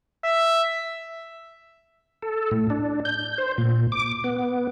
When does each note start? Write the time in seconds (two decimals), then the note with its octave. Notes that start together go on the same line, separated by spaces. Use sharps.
0.24 E5
2.22 A4
2.51 A2
2.70 D4
3.05 G6
3.38 C5
3.58 A#2
3.92 D6
4.24 B3